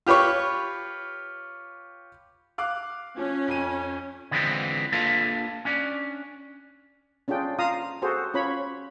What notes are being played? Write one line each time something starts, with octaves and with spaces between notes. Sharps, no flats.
F4 G4 B4 C#5 C#6
F5 D6 F#6
F3 C#4
F2 D#7
D3 E3 F3 G#3 B3 C4
A#3 D4 F4 A4 B4
C#4 D4
C#4 D4 F4 G#4 G5
F4 F5 A#5 D#6
F#4 G#4 A4 C5
C#4 F4 C#5 B5